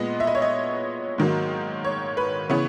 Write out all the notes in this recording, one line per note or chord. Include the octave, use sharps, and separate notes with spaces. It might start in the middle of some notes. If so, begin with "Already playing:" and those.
Already playing: A#2 G#3 B3 D#5
E5
D#5
C#5
D#5
G#2 D#3 F#3 A#3
C#5
B4
C#3 E3 B3 C#5